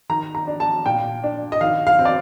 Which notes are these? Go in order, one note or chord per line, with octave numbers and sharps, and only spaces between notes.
D#3 A#5
A#5
D4
A5
A#2 G5
D4
D#5
D#3 F5
F5
C4
D5